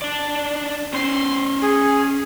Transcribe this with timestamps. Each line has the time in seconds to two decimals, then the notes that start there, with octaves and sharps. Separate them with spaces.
0.02 D4 D5
0.94 C#4 C5 C6
1.61 G#4